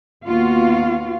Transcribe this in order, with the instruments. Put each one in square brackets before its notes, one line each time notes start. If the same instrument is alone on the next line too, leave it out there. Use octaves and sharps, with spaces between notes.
[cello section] D#2 B3 F4 F#4 F5